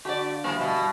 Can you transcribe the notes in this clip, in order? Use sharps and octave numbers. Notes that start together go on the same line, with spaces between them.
D3 F#4 D5
F5
E3 F3 G3 A#3
B2
G2